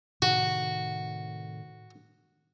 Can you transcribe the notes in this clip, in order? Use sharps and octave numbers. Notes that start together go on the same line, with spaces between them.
A2 C3 D#3 F#4